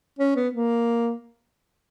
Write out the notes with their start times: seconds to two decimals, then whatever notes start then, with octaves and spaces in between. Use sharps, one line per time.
0.19 C#4
0.36 B3
0.53 A#3